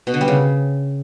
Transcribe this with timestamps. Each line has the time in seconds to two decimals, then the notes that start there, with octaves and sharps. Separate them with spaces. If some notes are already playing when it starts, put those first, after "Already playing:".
0.07 B2
0.14 D3
0.21 G3
0.28 C#3